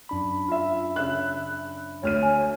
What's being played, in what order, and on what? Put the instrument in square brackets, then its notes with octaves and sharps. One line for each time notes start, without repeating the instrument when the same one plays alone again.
[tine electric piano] F#2 D4 B5
[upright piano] F4 E5
C#3 E5 F#6
[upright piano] D2 F6 D#7 [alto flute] C#5
[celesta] G#5